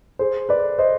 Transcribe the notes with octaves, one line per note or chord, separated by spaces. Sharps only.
G#4 C5
B4 D5
C5 D#5